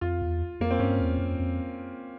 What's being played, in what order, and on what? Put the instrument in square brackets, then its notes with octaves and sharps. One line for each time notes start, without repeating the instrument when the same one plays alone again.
[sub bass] F2 [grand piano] F4
[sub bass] E2
[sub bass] F2 [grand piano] A#3
[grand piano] C4
[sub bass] G2 [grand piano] C#4
[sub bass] E2
F2
F2